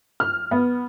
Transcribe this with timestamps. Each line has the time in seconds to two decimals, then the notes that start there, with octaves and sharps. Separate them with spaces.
0.20 F6
0.51 B3